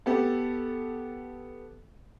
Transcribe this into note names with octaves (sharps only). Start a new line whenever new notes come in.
B3 G4 A4